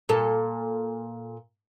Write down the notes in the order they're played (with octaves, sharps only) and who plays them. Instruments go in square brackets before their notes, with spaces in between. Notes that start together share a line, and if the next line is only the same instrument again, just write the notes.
[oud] A#2 A4